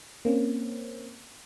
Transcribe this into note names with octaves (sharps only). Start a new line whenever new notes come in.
A#3 C4 C#4